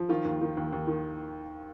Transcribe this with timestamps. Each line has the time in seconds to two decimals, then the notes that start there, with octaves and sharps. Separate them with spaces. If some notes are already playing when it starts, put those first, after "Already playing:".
Already playing: F3
0.09 D#3 F4
0.25 D#2
0.41 D#3
0.57 D#2
0.73 D#2
0.87 D#3